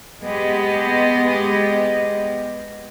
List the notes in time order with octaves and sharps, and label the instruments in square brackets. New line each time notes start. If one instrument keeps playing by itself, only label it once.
[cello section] G#3 B3 G4 D#5